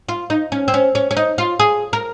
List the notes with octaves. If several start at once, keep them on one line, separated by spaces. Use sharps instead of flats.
F4
D#4
C#4
C4
C#4
C#4
C#4
D#4
F4
G#4
A#4